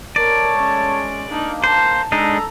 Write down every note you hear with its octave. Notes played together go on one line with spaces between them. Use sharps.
A3 A#4 C#5 D5 A5
G#3 C#4
A#3 D4 D#4
C5 A5 A#5
G#3 D4 D#4 A4 A#5